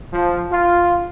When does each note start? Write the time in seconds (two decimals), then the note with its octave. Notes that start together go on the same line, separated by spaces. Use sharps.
0.13 F3
0.51 F4